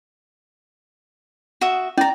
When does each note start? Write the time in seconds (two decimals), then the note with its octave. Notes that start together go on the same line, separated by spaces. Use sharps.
1.61 F#4 E5 D#6
1.98 C#4 D5 A#5